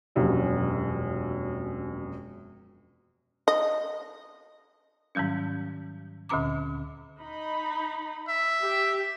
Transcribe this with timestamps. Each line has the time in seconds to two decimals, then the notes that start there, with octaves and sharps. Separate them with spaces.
0.16 E1 A#1 F#2 C3
3.48 D#5
5.15 G#2 D#3 F#3 G3 C#4
6.29 D2 A#2 D3 C#4 A#5 D6
7.20 D#4 B5
8.28 E5
8.62 G4